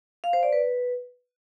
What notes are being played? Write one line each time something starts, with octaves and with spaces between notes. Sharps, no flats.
F5
C5
D5
B4